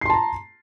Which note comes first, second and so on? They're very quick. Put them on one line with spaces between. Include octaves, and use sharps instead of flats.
C7 C6 A5 A#5